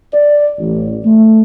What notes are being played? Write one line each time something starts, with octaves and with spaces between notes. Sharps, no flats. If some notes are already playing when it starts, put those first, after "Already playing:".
D5
A1
A3